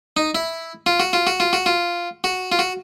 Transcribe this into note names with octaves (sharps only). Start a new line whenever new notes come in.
D#4
E4
F4
F#4
F4
F#4
F4
F#4
F4
F#4
F4
F#4